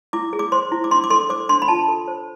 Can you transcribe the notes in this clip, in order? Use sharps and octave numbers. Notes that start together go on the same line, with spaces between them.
E4 D6
G#4
D6
C5 C6
E4
D6
D4 C6
D6
A4 C6
C5 D6
D4 C6
B5
F4 A5
A4
C5